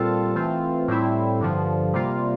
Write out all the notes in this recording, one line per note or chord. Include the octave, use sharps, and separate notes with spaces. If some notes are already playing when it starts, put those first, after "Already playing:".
Already playing: A#2 G3 C4 F4 A4
E3 A3 C4 F4
A2 G3 C4 E4
G2 D3 F3
C3 G3 A#3 F4